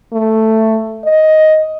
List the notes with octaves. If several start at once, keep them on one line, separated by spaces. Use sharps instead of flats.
A3
D#5